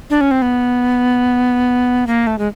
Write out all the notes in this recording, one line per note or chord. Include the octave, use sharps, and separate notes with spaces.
D4
C#4
C4
B3
A#3
A3
G#3